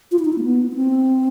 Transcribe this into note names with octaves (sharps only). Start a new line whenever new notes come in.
F4
E4
D#4
E4
A#3
B3
B3
C4